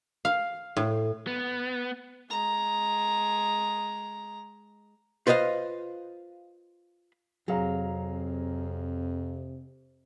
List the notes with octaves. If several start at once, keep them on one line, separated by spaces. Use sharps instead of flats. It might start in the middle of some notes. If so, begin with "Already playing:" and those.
F5
A2
B3
G#3 A#5
F4 B4 C5 D#5 F5
F2 C3 F#3 G#4 F5 A#5